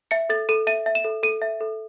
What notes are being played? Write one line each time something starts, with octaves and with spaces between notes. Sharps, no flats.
E5 C#7
A4 A6
A4 D#7
E5 D#7
E5
E7
A4
A4 D#7
E5
A4